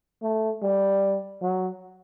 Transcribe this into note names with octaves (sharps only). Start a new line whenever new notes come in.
A3
G3
F#3